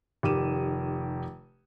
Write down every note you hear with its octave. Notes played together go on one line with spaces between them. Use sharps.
F1 D#3 G4 D6 D#7 E7